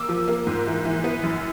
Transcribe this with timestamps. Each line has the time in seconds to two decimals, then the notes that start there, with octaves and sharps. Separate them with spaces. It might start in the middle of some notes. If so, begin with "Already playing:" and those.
Already playing: A#3 D6 E6
0.09 F3
0.28 A#3
0.47 G#2
0.67 E3
0.85 E3
1.04 B3
1.23 F#2